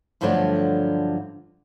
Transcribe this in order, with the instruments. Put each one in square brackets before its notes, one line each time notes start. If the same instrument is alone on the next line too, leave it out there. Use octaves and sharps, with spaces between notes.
[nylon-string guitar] D2 G2 D3 F3 F#3 D4